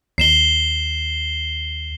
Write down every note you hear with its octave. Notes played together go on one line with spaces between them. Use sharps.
D#2 C7 E7 G7